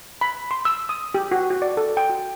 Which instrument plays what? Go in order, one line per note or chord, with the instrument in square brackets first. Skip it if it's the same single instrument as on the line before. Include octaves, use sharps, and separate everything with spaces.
[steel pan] B5
C6
E6
D#6
G4
F#4
F#4
D5
A4
G5
F#4